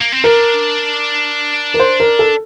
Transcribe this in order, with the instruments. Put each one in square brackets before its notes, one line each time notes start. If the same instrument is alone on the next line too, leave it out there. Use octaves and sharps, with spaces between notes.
[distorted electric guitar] A#3
C4
[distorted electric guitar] D4 [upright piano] A#4
[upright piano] A#4
C5
A#4
A4